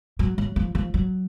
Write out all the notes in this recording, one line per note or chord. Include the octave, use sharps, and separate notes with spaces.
F#3
F#3
F3
F3
F#3